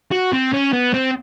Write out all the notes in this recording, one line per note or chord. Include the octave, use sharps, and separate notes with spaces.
F#4
C4
C#4
B3
C4